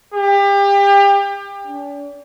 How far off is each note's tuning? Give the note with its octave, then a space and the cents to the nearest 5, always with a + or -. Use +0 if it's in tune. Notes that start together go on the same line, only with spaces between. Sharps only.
G4 +30
D4 -40